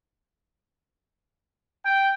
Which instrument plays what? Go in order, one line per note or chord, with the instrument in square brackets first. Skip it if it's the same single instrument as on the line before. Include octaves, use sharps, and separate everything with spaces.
[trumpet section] G5